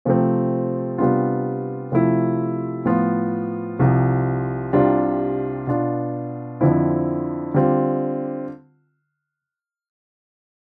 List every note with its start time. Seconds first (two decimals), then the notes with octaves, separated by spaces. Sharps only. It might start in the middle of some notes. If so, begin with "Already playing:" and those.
0.05 C3 F3 A3 C4
0.98 C3 G3 B3 D4 F4
1.92 C3 F3 A3 E4
2.85 A2 F3 B3 F4
3.79 C2 C3 F3
4.73 C2 C3 G3 D4 F4
5.67 B2 B3 D4 F4
6.61 F2 D3 F3 C4 E4
7.54 D3 G3 C4 F4